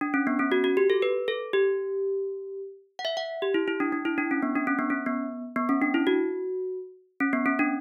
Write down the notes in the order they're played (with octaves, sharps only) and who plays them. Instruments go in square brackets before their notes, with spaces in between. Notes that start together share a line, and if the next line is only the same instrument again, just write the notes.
[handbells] D4
C#4
B3
C#4
F#4
F#4
G4
A4
B4
A4
G4
F#5
E5
F#5
G4
E4
E4
D4
D4
E4
D4
C#4
B3
D4
C#4
B3
C#4
B3
B3
C#4
D4
E4
F#4
C#4
B3
C#4
D4